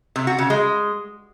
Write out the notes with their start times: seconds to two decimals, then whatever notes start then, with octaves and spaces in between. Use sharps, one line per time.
0.16 C3
0.27 F#4
0.38 C#3
0.50 G#3